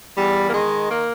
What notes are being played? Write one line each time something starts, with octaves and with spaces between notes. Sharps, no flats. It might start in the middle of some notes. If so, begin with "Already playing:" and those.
E2 G3
A#3
D#3 G#3
A#3